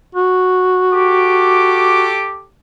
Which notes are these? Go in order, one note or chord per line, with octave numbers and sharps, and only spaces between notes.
F#4
G4 A4 D6